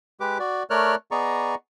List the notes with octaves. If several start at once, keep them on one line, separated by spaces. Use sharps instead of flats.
G#3 G4 B4 D6
F#4 D5
A3 A#4 C#5 D5 F6 F#6
B3 G#4 D5 D#5 A#5 C#6